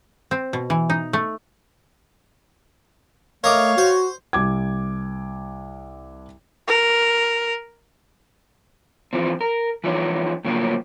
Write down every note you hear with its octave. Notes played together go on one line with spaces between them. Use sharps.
C4
B2
E3
D#4
A3
A3 A#4 C#5 D#5 F5 D6
F#4 C5
C2 D6 G#6
A#4
E3 F3 C4
A#4
E3 F3 C#4 D#4
A2 C#3 F3 F#3 A#3